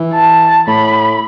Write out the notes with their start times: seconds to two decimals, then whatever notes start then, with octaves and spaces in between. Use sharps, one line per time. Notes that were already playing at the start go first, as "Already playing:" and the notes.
Already playing: E3
0.13 A5
0.67 A2 B5